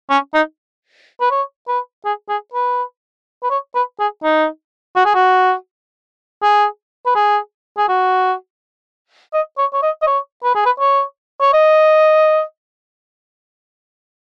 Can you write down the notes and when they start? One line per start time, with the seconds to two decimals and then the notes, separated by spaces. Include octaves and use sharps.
0.10 C#4
0.34 D#4
1.21 B4
1.31 C#5
1.68 B4
2.05 G#4
2.29 G#4
2.54 B4
3.43 B4
3.50 C#5
3.75 B4
4.00 G#4
4.24 D#4
4.96 F#4
5.06 G#4
5.15 F#4
6.43 G#4
7.06 B4
7.15 G#4
7.78 G#4
7.89 F#4
9.34 D#5
9.58 C#5
9.73 C#5
9.83 D#5
10.02 D#5
10.07 C#5
10.44 B4
10.55 G#4
10.66 B4
10.80 C#5
11.41 C#5
11.53 D#5